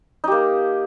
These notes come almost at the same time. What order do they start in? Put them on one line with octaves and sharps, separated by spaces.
D#4 G4 A#3